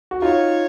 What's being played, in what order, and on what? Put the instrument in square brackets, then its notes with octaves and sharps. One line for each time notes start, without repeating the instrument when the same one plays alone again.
[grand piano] F#4
[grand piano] D#4 F4 [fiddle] C#5